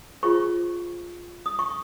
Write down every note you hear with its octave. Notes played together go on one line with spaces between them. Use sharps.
F4 G#4 C5 C#6
D#6
C#6